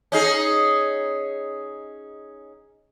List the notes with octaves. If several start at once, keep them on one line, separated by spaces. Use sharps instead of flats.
C#4 D#4 G#4